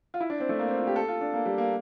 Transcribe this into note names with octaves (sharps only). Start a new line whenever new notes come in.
F4
E4
D4
C4
A3
A#3
C4
F4
G4
A4
F4
D4
A#3
G3
A#3